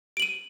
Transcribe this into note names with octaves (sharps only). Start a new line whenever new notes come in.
D7 D#7 F#7